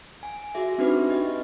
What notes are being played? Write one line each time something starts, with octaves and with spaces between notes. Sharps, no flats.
G#5
F#4 G#4 E5
C4 D4 D#4 F#4 G4 B4
G4 B4 D#5